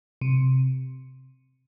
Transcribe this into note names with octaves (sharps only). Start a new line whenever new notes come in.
C3